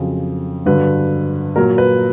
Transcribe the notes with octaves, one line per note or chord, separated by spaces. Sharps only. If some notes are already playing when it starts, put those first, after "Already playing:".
Already playing: F2 C#3 F#3
G2 D3 F#3 B4
A#2 F#3 A#4
B4